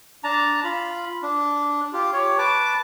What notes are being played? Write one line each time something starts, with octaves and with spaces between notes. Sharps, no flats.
D4 A5 A#5
F4 B5
D4
F4 G4
G4 C#5
B4 A5 D6